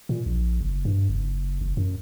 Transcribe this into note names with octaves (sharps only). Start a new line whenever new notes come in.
A#2
A#1
F#1
G2
F#1
F#1
F#2